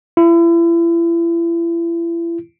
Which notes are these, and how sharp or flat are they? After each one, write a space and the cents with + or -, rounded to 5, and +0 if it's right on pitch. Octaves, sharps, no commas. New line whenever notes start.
E4 +35